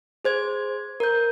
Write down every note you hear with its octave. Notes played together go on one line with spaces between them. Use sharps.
G#4 C5 G#6
A#4 G6